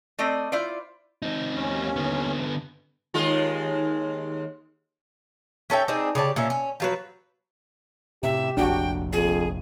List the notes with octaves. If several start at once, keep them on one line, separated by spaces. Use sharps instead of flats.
A3 C4 D5 D#5
E4 F4 C5 D5
C4 D#4
D#2 C#4
D3 B3
D#2 G#3 F4
C#4 A4 E5 G5
C4 D4 D#4 G#4
C#3 G4 D5 A5
A#2 C#4 E5
C#4
F3 F#3 B4
A2 C3 G4 E5
F1 A#1 D4 F#4 G5
F2 G#4